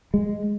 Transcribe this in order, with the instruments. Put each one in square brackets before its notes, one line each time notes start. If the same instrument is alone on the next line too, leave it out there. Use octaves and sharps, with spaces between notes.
[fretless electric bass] G#3